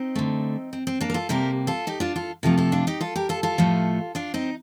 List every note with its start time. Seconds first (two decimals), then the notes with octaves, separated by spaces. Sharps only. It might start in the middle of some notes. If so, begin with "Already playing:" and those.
Already playing: C4 D#4
0.15 D3 A3
0.73 C4
0.87 C4
1.01 A#3 D4
1.10 A#4
1.14 F4 A4
1.29 C3 G3 A#3 G4 A#4
1.67 F4 A4
1.87 D#4 G4
2.00 D4 F4
2.16 F4 A4
2.43 C3 F3 A3 F4 A4
2.58 F4 A4
2.72 D4 F4
2.87 D#4 G4
3.01 F4 A4
3.16 G4 A#4
3.29 F4 A4
3.43 F4 A4
3.58 A2 F3 A3
4.15 D4 F4
4.34 C4 D#4